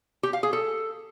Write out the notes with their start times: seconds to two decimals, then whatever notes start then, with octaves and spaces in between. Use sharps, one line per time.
0.23 G4
0.33 F5
0.43 G#4
0.53 A4